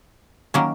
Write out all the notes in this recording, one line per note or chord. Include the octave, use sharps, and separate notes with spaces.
D#3 F#3 A#3 C#4